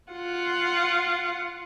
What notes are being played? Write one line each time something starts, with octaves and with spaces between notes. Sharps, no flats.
F4 F#5